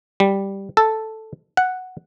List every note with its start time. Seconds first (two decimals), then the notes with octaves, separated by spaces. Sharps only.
0.20 G3
0.77 A4
1.57 F#5